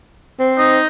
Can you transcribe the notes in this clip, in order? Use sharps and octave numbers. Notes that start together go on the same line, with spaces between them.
C4
D#4